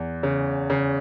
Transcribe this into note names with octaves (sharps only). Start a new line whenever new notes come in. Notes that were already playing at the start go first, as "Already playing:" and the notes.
Already playing: E2
C#3
C#3